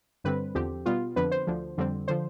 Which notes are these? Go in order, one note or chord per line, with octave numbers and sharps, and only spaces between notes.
G2 D3 G3 C4 B4
E2 D3 F3 C4 G4
B2 G3 B3 F4
F2 D3 F3 B3 B4
C5
D2 D3 F3
F2 D3 G3 C4
D3 F3 C5